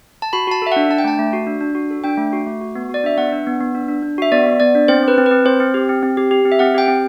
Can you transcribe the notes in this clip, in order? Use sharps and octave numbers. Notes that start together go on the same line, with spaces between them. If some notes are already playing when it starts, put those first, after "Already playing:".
A5
F#4 B5
F#4 A5
A4 E5
F#5
D4
D4 A5
G5
A3 A5
A3
F#4
D4
D4
F#4
A4
D4 G5
A3
F#4
A3
F#4
B3
F#4 D5
D4 E5
B3 F#5
D4
B3
B3
D4
D4
D4
F#4 E5
B3 D5
B3
B3 D5
D4
C4 C5
C4 B4
C4
B4
C4
C4 C5
C4
G4
C4
C4
G4
G4
C4
E5
C4 F#5
G4 G5
C4